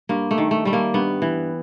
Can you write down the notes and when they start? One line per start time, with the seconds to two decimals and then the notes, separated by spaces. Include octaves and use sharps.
0.09 G2 A#3
0.31 A3
0.38 D#3
0.51 A3
0.65 G3 A3
0.73 A#3
0.94 G2 B3
1.22 E3